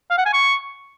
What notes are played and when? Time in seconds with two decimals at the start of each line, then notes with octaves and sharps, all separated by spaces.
0.11 F5
0.18 F#5
0.26 G#5
0.33 C#6